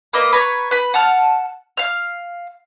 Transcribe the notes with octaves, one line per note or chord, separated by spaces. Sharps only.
A#3 B4 D#5
B4 C#5 A#5
B4 B5
F#5 A5 F6
F5 F6